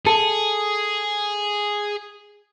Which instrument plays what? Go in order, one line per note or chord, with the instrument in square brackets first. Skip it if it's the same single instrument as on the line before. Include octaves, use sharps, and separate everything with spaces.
[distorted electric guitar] G#4 [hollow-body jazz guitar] A4